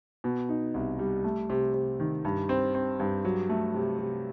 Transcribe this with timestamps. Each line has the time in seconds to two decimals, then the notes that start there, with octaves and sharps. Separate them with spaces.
0.24 B2
0.49 D#4
0.74 C2
0.99 G3
1.24 A3
1.50 C3
1.74 C3
2.00 D#3
2.25 G2
2.49 C4
2.75 C4
3.00 G2
3.25 F#3
3.49 A3
3.74 C3
3.99 C3